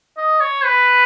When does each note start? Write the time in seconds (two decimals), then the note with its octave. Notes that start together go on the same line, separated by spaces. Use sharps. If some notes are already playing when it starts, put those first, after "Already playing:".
0.17 D#5
0.41 C#5
0.65 B4